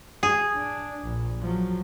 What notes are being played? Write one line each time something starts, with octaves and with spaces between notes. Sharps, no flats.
G#4
D4
A#1
F3 F#3